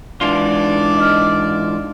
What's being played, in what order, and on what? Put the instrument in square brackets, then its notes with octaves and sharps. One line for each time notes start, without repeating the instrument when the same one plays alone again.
[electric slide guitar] G#2 E3 F4 [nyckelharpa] D4 D5
[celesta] D#5 F6